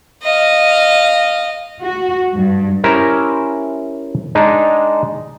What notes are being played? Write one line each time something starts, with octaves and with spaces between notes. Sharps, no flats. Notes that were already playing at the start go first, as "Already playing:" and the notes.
D#5 F5
F#4
G2
C#4 E4 G4 A#4 C5
G#3 D4 D#4